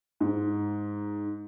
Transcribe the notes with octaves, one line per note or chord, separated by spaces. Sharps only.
G#2